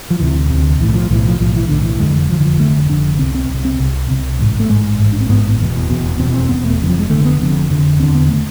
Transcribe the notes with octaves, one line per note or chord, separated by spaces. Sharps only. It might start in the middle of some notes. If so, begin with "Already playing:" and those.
F3
D2 C3 E3
D2 C3
B1 A2 E3
F3
B1 A2 E3
F3
B1 A2 F3
E3
B1 A2 D3
E3
F1 F2 D3 G#3
F3
E3
F1 F2 D3 F3
E3
F3
F1 F2 D3 A3
F1 F2 D3 D4
C2 C3 C4
C4
C2 C3
C4
C2 C3
C2 C3
A1 G#2
A3
A1 G#2 G#3
A1 G#2
D4
C4
A1 G#2 B3
F1 E2 B2
F1 E2 B2
F1 E2 B2 C4
C4
F1 E2 B2 B3
A3
F1 F2 D3
F3
G#3
F1 F2 D3 A3
B3
F1 F2 D3
F1 F2 D3
E1 E2 D3 C4
B3
D3 A3